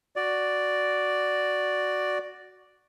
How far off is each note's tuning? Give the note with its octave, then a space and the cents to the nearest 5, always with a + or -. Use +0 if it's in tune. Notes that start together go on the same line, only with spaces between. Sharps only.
F#4 +0 D5 +0